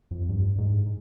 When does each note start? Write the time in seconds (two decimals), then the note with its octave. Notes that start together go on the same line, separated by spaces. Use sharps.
0.11 F2
0.29 G2
0.58 G#2